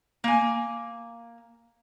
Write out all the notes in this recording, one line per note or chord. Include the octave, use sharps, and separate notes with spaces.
A#3 G#5